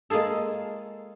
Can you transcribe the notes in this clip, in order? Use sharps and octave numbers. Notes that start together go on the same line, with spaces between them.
G#3 A#3 F4 G#4 A4